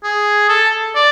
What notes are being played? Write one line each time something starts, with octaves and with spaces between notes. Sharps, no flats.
G#4
A4
D5